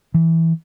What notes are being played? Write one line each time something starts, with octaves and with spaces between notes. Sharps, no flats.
E3